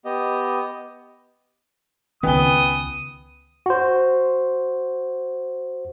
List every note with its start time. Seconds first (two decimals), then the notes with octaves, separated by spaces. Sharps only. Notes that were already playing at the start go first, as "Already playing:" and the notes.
0.05 B3 G4 D#5
2.23 C#2 D#3 B3 G5 G#5 D#6 G7
3.66 F#4 C5